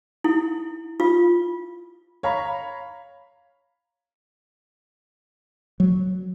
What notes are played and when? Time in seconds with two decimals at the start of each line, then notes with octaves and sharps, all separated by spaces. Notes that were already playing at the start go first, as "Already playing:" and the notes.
0.24 E4
1.00 F4
2.23 C#5 F5 A#5 B5
5.80 F#3